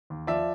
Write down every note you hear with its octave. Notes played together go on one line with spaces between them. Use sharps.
D#2
F3 D5 E5